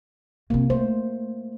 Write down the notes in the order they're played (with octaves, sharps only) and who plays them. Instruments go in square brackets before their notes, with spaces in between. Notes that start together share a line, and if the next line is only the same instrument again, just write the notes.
[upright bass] C3 C4 [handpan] A#3
[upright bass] A3 [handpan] C5